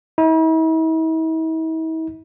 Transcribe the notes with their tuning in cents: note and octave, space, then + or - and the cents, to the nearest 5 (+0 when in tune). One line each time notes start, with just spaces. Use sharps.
E4 -45